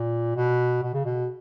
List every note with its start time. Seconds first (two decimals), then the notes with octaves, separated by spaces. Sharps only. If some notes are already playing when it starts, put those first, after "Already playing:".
Already playing: A#2
0.36 B2
0.82 B2
0.94 C#3
1.05 B2